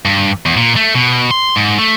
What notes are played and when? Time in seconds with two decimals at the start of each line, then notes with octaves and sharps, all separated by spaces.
0.05 G2
0.46 E2
0.57 A#2
0.76 A3
0.95 B2
1.31 C6
1.56 G#2
1.78 A3